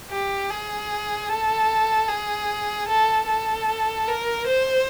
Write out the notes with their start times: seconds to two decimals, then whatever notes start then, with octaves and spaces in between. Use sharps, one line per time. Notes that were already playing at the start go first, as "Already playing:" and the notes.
0.11 G4
0.50 G#4
1.29 A4
2.08 G#4
2.88 A4
3.28 A4
4.08 A#4
4.47 C5